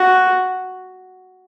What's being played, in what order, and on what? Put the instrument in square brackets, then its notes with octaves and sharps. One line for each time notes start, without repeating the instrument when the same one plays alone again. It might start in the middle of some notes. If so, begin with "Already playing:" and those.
Already playing: [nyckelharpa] F#4